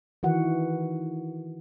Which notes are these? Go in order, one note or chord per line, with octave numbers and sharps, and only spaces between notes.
D#3 E3 F#4 F#5